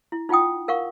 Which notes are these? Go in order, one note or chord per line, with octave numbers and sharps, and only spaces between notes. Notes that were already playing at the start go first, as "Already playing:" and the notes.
E4
D#4 F4 F#5 G5 D#6
A#4 F5 F#5 C#6